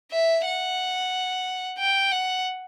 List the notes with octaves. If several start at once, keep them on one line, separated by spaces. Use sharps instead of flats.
E5
F#5
G5
F#5